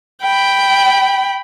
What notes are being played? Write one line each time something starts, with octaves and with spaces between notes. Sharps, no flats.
G5 B5